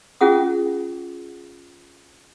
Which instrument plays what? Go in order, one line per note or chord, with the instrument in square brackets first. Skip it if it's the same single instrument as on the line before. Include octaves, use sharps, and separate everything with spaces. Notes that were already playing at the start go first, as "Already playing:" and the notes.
[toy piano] C#4 F4 G#4 F#5 D#6